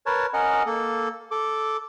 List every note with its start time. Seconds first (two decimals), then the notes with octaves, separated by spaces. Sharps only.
0.06 A#4 B4 C#5 A5
0.34 C#4 A#4 D#5 F#5
0.66 A#3 A4
1.31 A4 D6